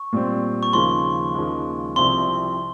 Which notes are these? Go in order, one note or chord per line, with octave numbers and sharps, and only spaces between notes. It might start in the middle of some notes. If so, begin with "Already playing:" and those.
Already playing: C#6
A#2 G3 C4
C#6
D#2 C#3 F3 G#3 C6
D#2 C#3 F3 G#3
C2 C3 F3 C4 C6